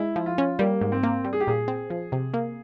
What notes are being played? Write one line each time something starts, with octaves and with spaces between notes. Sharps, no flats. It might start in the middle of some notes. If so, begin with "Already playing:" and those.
Already playing: G#3 E4
F3
F4
C#4
G3 A#3
G#2
C4
A#3
G3
G#4
G4
A#2 G#4
C4
F3
C3
A#3